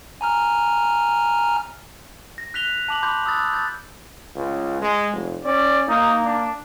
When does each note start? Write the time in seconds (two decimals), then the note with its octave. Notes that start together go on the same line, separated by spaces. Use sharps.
0.21 G#5 A#5 F6
2.38 A#6
2.54 F#6 B6 F7 G7
2.88 A5 D6 F#7
3.03 B5 C6 D6 F#6 G6
3.25 B5 D#6 E6 F#6 A6
3.53 G6 A6
4.35 C#2
4.81 G#3
5.13 F1
5.45 C#4 D5
5.88 A#3 D#4
6.24 D4